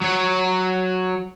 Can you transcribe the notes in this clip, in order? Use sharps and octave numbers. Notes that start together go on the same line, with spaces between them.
F#3 C#5